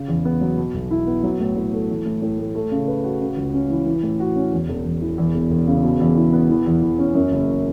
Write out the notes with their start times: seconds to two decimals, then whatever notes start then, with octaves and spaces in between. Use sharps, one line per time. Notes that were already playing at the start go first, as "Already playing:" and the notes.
Already playing: C#3
0.08 E2
0.25 B3
0.41 F#3
0.58 B2
0.74 B1
0.91 E4
1.07 B3
1.23 F#3
1.40 A2
1.56 A2
1.73 A3
1.89 E3
2.06 A2
2.22 A2
2.38 A3
2.55 A3
2.71 C#3
2.88 B4
3.04 F#4
3.21 C#3
3.37 C#2
3.54 C#4
3.70 E3
3.86 E3
4.03 A2
4.20 F#4
4.36 C#4
4.52 E2
4.69 E1
4.85 E1
5.01 E3
5.18 E2
5.34 E1
5.50 E1
5.67 C#3
5.83 B2
6.00 E2
6.16 E4
6.33 B3
6.50 E3
6.66 E2
6.82 E2
6.99 C#4
7.15 F#2
7.32 F#1